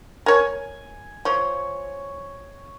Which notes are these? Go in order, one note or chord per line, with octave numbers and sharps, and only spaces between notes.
A#4 C#5 G#5
F3 C#5